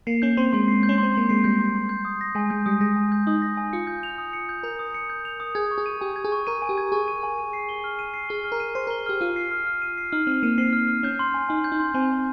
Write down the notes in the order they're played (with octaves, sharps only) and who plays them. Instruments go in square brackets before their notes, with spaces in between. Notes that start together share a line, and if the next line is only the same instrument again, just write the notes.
[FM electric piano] A#3 [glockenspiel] C7
[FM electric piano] C#4 [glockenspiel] G6
[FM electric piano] C4 [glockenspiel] C6
[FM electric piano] G#3 [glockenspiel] C6
[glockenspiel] C7
G6
[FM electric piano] C#4
[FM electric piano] C4 [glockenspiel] C6
[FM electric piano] A#3 [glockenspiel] C6
[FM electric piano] G#3 [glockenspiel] C7
[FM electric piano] G3 [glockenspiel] G6
[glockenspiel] C6
C6
G6
D#6
A#6
[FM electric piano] G#3 [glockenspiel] G#5
[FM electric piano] G#3 [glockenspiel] G6
[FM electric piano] G3 [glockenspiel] D#6
[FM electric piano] G#3 [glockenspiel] A#6
[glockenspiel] G#5
G6
[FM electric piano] D#4 [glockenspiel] D#6
[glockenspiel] A#6
G#5
[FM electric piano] F4 [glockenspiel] C#7
[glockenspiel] G6
F7
D#6
C#7
G6
[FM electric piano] A#4 [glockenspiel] F7
[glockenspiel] D#6
C#7
G6
F7
D#6
[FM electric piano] G#4 [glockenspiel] G#6
[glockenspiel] C#6
[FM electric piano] G#4
[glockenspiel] D#7
[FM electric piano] G4 [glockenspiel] G#5
[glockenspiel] G#6
[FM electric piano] G#4
[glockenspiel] C#6
[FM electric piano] A#4 [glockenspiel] D#7
[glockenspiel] G#5
[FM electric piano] G4
[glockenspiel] G#6
[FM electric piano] G#4 [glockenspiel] C#6
[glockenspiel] D#7
G#5
D#7
C7
G7
F6
D#7
C7
[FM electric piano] G#4 [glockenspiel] G7
[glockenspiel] F6
[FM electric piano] A#4
[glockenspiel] D#7
[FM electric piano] C5 [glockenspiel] C7
[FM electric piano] A#4 [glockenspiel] G7
[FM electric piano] G4 [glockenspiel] F6
[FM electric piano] F4 [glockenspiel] D#7
[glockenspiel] C7
F6
F6
D#7
C7
[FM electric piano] D#4 [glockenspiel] F6
[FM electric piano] C4 [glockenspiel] F6
[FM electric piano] A#3 [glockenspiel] D#7
[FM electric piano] C4 [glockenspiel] C7
[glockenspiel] F6
F6
[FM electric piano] C#4 [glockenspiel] G6
[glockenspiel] C6
G#5
[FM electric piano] D#4 [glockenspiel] G#5
[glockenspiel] G6
[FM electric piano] D#4
[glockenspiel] C6
[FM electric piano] C4 [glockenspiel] G#5
[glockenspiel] G#5